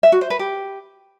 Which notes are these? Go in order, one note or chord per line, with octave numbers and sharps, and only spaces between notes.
E5
F#4
C5
B4
G4